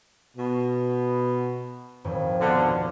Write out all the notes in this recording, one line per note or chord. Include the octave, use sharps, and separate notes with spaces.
B2
D#1 G#1 F2
B2 D3 F6